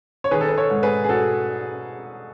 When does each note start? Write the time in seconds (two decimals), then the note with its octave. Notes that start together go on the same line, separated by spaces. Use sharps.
0.24 C#5
0.31 D#3 G#4 B4
0.41 A4
0.48 B4
0.57 A4 C#5
0.70 G#2
0.83 G#4 B4
1.04 G#4
1.09 F#4 A4